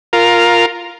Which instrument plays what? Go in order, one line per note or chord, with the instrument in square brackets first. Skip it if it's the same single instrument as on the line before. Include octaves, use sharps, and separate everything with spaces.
[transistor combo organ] F4 A#4